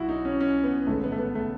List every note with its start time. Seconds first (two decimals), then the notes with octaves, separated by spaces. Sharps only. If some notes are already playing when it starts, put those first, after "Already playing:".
Already playing: B1 E4 F#4
0.09 D#4
0.25 C#4
0.40 C#4
0.64 B3
0.87 A1 G#2 D#3 G#3 A3
1.04 B3
1.12 A3
1.19 B3
1.35 A3